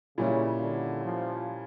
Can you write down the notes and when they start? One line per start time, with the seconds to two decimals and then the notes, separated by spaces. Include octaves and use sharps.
0.18 A#2 C#3 G3 C#4 E4
0.61 D3
1.05 F3